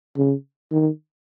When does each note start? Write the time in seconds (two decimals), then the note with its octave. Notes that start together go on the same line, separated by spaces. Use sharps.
0.17 C#3
0.72 D#3